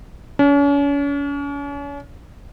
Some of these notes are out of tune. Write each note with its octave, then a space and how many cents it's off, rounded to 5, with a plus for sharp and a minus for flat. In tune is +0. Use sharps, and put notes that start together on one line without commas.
C#4 +40